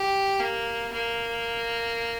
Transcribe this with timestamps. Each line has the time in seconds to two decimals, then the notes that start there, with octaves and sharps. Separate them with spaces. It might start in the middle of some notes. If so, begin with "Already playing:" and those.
Already playing: G4
0.40 A#3
0.93 A#3